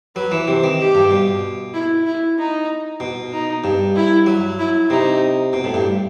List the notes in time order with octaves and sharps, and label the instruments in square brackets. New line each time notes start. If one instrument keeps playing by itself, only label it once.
[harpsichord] F#3 [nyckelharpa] B4
[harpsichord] E3
C3
D#3
[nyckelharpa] G4
[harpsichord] G2
B2
[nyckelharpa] E4
E4
D#4
[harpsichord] B2
[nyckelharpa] D#4
[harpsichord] G2
[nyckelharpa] E4
[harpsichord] F#3
[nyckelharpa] E4
[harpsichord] C3 [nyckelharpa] D#4
[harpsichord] B2
A2
G2